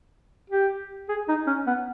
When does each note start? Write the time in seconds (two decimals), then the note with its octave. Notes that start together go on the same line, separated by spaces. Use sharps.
0.50 G4
1.09 G#4
1.28 D#4
1.47 C#4
1.67 B3